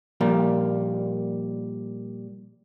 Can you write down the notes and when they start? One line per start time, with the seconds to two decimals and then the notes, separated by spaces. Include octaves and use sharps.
0.21 A#2 F3 G3 A#3